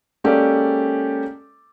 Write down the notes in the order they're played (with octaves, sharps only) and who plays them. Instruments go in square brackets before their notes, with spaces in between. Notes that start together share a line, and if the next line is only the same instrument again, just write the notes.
[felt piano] G#3 A#3 C#4 G4 A4 D5